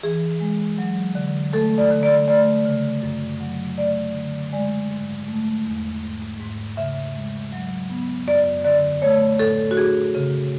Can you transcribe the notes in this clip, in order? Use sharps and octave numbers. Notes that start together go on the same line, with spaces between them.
E3 G#4
G#3
F#3
D3
A3 A4
D5
D3
D5
A3 D5
C#3
F#2
F#3
A3 D5
D3
G#3 D5
G#2
A3
E2
G#2
G#2
C#3 E5
G#3
F#3
B3
F#2 D5
D3 D5
A3 C#5
A2 A4
F#4
D4 G#4
C#3